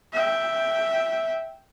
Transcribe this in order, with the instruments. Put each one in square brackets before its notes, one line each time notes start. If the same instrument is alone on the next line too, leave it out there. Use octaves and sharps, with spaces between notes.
[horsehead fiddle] E5 G5